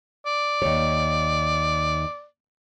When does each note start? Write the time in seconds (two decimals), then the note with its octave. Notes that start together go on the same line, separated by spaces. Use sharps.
0.26 D5
0.62 D#2 C#5